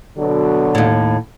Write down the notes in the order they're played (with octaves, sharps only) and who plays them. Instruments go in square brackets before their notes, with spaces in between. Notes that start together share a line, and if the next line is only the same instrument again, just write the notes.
[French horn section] B2 D3 F#3
[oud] D#2 A2